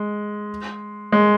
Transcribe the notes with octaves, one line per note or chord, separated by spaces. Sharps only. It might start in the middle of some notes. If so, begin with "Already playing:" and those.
Already playing: G#3
G#3